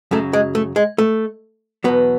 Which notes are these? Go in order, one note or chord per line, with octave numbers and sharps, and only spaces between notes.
F#2 C#3 F#3 A3
G#3
A3
G#3
A3
E2 B2 F#3 B3